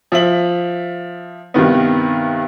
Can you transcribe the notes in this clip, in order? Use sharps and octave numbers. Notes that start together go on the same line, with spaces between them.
F3 E5 F#7
G2 C3 D#3 B3